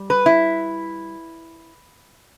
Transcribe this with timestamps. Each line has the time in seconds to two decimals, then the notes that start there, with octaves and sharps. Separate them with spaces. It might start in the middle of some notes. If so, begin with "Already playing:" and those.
Already playing: G3
0.10 B4
0.26 E4